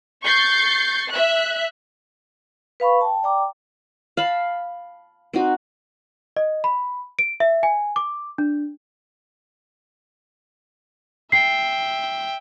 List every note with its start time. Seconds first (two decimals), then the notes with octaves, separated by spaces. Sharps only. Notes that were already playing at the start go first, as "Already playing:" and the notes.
0.24 C#6 G6 A6 C7
1.09 E5 F#6
2.80 B4 F5 B5 C#6
3.01 G5 A5
3.23 D5 G5 A#5 D6
4.17 F5 A5 B5
5.33 C4 D#4 F#4
6.36 D#5
6.64 B5
7.19 D7
7.40 E5
7.63 G#5
7.96 D6
8.38 D4
11.32 E5 G5 C7